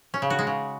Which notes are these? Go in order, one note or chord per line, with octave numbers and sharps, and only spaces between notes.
C#4
C#3
F#4
G#3
C#3